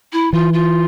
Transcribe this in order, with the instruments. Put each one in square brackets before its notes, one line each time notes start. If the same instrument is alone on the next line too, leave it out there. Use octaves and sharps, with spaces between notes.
[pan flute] E4
[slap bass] E3 [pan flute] F4
[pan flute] F4